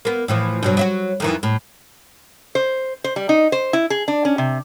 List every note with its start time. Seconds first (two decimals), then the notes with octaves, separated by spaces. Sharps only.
0.05 A#3 B3
0.28 A2 E3 F3
0.63 G2 B2 F#3
0.77 F#3 E4 F#4
1.20 F2 D#3 E3
1.43 A2
2.55 C5
3.04 C5
3.16 G3
3.29 D#4
3.52 C5
3.73 E4
3.90 G#4
4.08 D4
4.25 C#4
4.38 C3